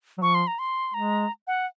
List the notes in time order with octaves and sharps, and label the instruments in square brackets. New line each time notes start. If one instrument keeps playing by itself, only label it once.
[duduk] F#3
[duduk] F3 [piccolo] C#6
[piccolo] C6
A#5
C6
[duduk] G#3 [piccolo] A#5
[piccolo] F#5